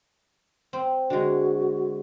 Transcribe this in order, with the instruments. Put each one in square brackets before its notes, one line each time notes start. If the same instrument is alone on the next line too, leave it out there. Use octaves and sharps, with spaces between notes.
[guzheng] C4
[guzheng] D3 G#3 [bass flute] F#4